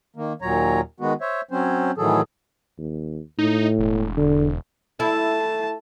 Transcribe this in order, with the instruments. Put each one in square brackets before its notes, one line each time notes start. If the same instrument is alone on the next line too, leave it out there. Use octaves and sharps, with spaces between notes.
[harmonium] D#3 A#3
D#2 A#2 F#3 C#5 A#5
D#3 G#3 B3 F#4
C5 C#5 E5
F#3 C4 C#4 C5
A2 D#3 E3 F#3 G#4 A4
[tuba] D#2
[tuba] A2 [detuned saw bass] D#4
[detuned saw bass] E1
[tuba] D3
[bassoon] A3 [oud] E4 [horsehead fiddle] A5